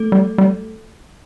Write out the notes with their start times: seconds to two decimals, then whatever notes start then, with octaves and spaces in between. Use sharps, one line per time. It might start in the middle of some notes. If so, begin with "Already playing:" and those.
Already playing: A3 A4
0.12 G3
0.38 G3